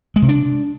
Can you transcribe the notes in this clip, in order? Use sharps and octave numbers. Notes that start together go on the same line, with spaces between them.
G#3
C3
D4